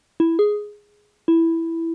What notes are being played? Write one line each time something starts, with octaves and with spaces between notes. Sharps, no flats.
E4
G#4
E4